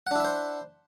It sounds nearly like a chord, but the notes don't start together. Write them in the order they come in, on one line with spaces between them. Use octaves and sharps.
F#5 D4 E4 E5 C5